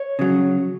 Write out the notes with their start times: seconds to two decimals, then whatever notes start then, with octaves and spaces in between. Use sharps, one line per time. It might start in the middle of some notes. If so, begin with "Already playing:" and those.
Already playing: C#5
0.19 C#3 F#3